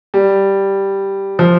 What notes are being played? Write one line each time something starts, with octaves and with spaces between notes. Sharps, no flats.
G3
F3